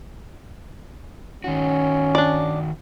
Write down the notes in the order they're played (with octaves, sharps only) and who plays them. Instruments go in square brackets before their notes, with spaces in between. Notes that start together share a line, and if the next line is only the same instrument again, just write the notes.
[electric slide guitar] D#3 F#4 [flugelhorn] C#4
[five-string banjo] D4 D5